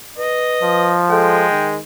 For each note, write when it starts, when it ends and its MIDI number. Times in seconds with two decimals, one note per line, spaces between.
0.18 0.93 71
0.18 1.04 75
0.63 1.48 53
1.10 1.78 56
1.10 1.43 69
1.10 1.69 79
1.50 1.81 51